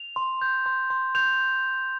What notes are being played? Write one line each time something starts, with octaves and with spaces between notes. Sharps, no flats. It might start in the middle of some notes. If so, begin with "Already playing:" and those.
Already playing: F7
C6
G6
C6
C6
G6 F7